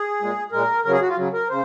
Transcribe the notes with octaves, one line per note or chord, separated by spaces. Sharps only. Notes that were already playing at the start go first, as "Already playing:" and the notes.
Already playing: G#4
A#2 G#3
A#2 G#3 A#4
C#3 F#3 A#4
G#4
F#4
F4
C#3 F#3
A#4
C#3 C5